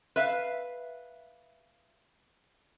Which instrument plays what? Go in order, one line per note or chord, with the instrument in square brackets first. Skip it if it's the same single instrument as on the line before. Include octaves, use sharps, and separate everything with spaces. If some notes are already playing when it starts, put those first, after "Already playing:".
[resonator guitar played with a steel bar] B4 E5 F5